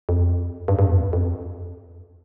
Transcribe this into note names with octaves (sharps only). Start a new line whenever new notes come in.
F2
G2
G2
F#2
F2
E2
F2